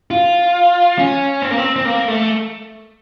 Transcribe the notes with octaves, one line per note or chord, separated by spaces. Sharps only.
F4
C#4
C4
A#3
C4
C4
A#3
A3